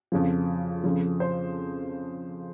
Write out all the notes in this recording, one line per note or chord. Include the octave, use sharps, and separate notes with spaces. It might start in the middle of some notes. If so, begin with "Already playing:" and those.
F2 C#3 F3
F2 C#3 F3
C5